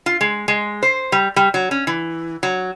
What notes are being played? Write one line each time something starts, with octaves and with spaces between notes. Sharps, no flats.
F4
G#3
G#3
C5
G3
G3
F#3
C#4
E3
F#3